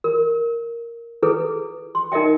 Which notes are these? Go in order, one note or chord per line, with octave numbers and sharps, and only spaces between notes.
A#4
E4 G#4 A4 B4
C6
D#4 A#4 D#5 E5 G5